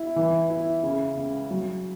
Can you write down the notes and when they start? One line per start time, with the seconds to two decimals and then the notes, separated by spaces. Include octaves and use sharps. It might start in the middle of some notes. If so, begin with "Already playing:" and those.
Already playing: E4
0.16 E3
0.50 E4
0.83 C#3
1.17 C#2
1.51 F#3